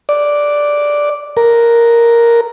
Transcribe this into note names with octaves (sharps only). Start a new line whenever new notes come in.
D5
A#4